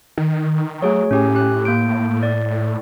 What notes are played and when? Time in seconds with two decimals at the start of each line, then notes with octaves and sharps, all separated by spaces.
0.18 D#3
0.82 F#3 A3 G#4 C#5
1.11 A2 C#4 G4 G#5
1.35 G4 F#6
1.65 A#3 G6 D7
2.23 D5